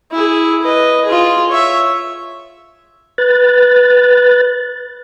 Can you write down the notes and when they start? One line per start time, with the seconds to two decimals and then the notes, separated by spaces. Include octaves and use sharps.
0.12 E4 G#4
0.62 B4 D#5
1.05 F4 G#4
1.49 C#5 E5
3.18 B4 F#6 A6